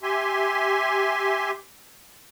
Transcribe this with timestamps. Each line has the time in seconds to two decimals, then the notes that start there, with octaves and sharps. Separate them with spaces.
0.03 G4 E5 G#5 C6